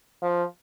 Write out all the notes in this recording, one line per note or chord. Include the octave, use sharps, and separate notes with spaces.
F3